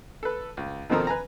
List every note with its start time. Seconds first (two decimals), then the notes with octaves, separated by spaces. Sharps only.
0.23 A4 B4
0.57 C#2
0.90 B2 D#3 F3 C4 A4 A#4
1.07 B4 G#5 A#5